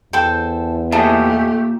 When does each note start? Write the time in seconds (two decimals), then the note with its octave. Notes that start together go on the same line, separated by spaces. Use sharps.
0.13 E2 A4 C5 G5
0.92 A#2 A3 G4 G#4 D#5 E5 A5